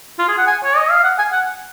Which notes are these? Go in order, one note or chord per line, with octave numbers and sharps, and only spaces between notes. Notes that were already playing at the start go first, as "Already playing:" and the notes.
F4
G#4
F#5
G#5
C#5
D#5
F5
F#5
G#5
F#5